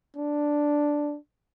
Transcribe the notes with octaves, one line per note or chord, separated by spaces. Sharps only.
D4